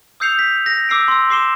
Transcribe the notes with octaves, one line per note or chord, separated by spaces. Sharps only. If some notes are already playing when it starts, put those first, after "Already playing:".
D#6 E6 G6 C7 C#7 F7
B6
A#6
D6 E6 C7 D7
C6 E6
C6 D6 C7 E7 G7